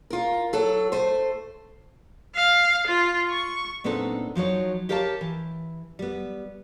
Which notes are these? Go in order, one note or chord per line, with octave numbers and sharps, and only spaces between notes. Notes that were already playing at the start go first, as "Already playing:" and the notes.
F4 A#4
F#3 A4
A3 C5
F5
F4
C#6
A#2 B3 C4 D4 D#4 A4
F3 F#3 D#4 C#5
G4 A#4 C#5 F5 F#5 A5
E3
G3 B3